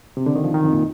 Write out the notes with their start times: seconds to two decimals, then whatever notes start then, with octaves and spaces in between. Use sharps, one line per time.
0.17 C3
0.26 D3
0.36 D#3
0.44 F3
0.54 D#3
0.64 F2
0.73 A#2